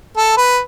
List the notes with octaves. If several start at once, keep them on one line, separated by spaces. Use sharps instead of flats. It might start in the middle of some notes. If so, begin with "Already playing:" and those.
A4
B4